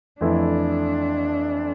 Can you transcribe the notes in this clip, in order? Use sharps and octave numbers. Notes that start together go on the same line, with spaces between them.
F2 E3 A3 D4 E4